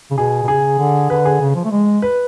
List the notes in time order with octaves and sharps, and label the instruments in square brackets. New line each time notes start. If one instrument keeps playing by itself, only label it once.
[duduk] C#3
[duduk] B2 [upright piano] G#4
[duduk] B2
[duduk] C#3 [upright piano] G#4
[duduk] D3
[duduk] D3 [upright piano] B4
[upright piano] G#4
[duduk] C#3
F3
A3
G#3
[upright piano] B4